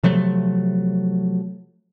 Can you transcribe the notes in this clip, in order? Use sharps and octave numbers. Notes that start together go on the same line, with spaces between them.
C3 F3 F#3 A3